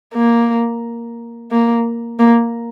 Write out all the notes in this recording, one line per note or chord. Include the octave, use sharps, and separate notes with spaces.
A#3
A#3
A#3